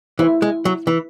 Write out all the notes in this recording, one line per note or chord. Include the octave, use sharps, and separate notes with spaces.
E3 E4 C5 E5
G#3
F#3
E3